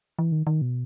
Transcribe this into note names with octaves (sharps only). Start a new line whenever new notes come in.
E3
D#3
D#3
B2